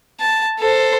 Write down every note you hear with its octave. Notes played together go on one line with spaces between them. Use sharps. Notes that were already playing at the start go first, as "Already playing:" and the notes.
A5
A4 C5